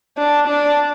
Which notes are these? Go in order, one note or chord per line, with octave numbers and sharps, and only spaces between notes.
D4
D4